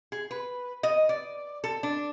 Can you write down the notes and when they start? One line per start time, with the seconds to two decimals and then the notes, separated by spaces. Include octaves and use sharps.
0.12 G#4
0.31 B4
0.83 D#5
1.09 D5
1.64 A4
1.83 D4